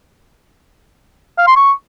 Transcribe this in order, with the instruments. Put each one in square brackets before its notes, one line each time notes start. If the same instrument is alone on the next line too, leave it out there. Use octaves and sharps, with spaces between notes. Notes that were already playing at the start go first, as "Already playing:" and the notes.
[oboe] F5
C6
C#6